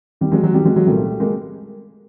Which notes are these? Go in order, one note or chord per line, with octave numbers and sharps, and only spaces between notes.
D#2 D#3 G3
F#3 G#3
F#3 G#3
D#2 D#3 G3
F#3 G#3
F#3 G#3
C2 A#2 G3 A3
G#3 A#3